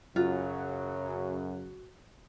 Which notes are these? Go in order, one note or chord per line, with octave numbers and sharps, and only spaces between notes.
F#2 C#3 F#3 F4 F#4